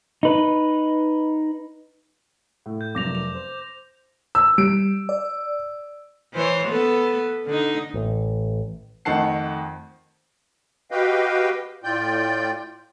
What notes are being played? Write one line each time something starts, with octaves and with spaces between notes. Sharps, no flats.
D#4 B4
A2
G6
F1 F#2 D6 A#6 F7
F7
C5
E6
G3 D7
D5
E3 C5 C#5
B3 A4 B4
D3 D#4
A1
F2 D#3 A3 F#5 A5 C7
F#4 G4 B4 D#5 F5 G5
A2 F4 D5 G5 G6